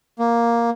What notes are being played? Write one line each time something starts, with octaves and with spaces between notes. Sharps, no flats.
A#3